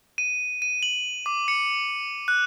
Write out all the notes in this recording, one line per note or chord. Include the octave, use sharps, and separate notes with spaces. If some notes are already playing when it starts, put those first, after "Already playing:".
D#7
D#7
F#7
D6
C#7
F#6